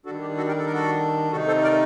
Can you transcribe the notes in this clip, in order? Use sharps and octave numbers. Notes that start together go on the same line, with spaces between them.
D#3 G3 D4 F#4 A4
G4
F#4 A4
G4 A#4
A4
A#4
F#4 A4
C3 D#3 A3 D#4 F#4 A4
A4 C5
A#4 D5